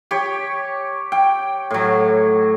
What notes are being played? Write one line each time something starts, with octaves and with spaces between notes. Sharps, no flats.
G4 C#5
G5
A2 F#3